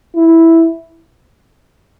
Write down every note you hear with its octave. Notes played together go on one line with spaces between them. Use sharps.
E4